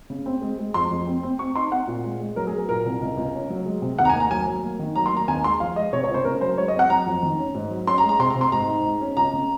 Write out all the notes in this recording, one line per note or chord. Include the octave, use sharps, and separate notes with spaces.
C#3
C4
G#3
G#3
F2 C6
F2
C4
C4
C4 C#6
D#4 C6
C4 F#5
A#2
G#3
G#3
F#3 A#4
G#4
F#3 A#4
A#2 A#4
C2
C#2
C#2
C#4
F#3
G#3
C3
D#2 F#5
A#5
G#5
A#3
A#5
F#3 G#5
F#3
A#3
D#3
F#3 A#5
C6
A#3 A#5
D#2 G#5
G#3 C6
F3 F5
G#3 D#5
C3 C#5
C#5
C#2
C5
C#3 A#4
F#3 C5
G#3 C#5
D#5
C4 F#5
F#3 A#5
F2
D#3
C#4
G#2
F#3
C#4 C6
A#5
G#3
A#5
C3 C6
A#5
C3
C6
G#2 A#5
D#4
G#3
C#4
C#2 A#5
C#3